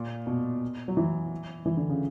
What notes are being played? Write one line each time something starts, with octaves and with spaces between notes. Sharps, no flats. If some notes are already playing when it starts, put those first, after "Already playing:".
Already playing: A#2
B2
F#3
E3
E3
D3
C#3